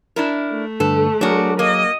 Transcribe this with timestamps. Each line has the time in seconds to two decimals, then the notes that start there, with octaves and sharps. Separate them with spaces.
0.16 D4 E4 A#4
0.51 A3
0.80 G2 D3 A4 B4
1.21 F#3 D4 F#4 G#4 A#4
1.59 A#3 D#5